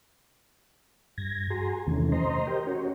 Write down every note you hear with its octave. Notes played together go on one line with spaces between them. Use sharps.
G2 G#6 A#6
F#4 G#4 G#5 A#5 C6
E2 C3 D#3 E3 A3 C#4
C5 D#5 A#5 C6
G4 A#4 C5 D#5 G5
C#4 F#4 C#5